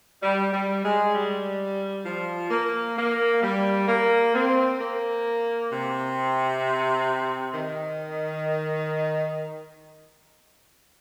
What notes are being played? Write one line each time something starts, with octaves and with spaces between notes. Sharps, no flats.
G3
G3
G#3
G3
F3
A#3
A#3
G3
A#3
C4
A#3
C3
D#3